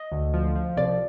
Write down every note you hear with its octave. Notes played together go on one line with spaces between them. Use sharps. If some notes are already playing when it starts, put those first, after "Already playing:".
Already playing: D#5
D2
F3
F3
C2 D5